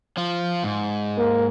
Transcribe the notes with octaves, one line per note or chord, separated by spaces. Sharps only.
F3 F4
G#2
A#3